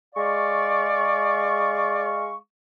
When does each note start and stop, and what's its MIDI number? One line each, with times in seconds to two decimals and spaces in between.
0.15 2.35 56
0.15 2.22 74
0.15 2.35 77
0.15 2.35 85